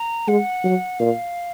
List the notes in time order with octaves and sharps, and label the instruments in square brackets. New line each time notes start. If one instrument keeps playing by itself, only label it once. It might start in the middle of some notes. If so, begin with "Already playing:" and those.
Already playing: [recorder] A#5
[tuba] G#3 [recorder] F#5
[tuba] F#3
[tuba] A#2 [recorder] F5